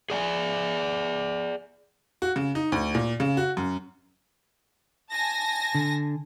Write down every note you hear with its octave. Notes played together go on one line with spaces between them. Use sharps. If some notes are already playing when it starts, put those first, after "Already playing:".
G#4 D5 G5 G#5
F#4
C#3
D#4
D2
A#2
C#3
F#4
F#2
G#5 A5 A#6
D3